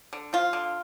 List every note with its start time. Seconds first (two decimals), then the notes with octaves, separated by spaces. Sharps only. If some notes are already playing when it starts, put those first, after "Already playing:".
0.13 D3
0.33 F3 F4
0.53 D3